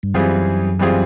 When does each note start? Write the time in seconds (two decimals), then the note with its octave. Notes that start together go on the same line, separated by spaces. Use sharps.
0.03 G2
0.14 F#2 E3 G3 C4 F4 G#4
0.79 E3 G3 C4 F4 G#4